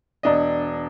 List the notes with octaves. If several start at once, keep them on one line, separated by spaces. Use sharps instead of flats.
E1 D4 D#5